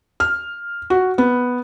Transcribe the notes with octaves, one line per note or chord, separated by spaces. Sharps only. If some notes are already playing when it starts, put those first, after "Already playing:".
F6
F#4
B3